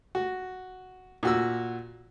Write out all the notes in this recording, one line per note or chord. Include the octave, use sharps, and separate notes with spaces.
F#4
A#2 F#4 E6